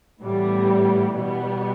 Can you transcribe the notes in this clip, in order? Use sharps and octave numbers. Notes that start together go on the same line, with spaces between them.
A2 E3 G3 B3
B2 G3 B3